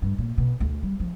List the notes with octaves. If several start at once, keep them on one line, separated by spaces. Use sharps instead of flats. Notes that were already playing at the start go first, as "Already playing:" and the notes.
G2
A#2
B2
D2
G3
F3